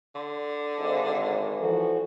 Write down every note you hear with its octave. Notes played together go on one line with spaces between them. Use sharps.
D3 C6
G#1 G#2 D#5
E3 F3 F#4 A4 B4 D5